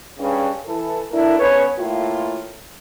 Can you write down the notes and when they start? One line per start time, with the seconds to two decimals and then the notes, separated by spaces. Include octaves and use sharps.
0.19 G2 C#3
0.66 E3 A4
1.10 A3 D4 E4 A4 A#4
1.39 C#3 B3 B4 C#5
1.77 A2 A3 A#3 F4